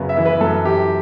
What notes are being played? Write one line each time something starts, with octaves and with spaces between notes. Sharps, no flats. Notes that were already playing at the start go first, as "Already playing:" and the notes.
Already playing: F#2 C#3 B3
E5
E3
B4
F#2 A4
E3 G4